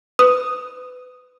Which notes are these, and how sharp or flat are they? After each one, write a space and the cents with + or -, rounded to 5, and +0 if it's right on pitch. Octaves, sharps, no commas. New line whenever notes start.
B4 +25 D#6 +0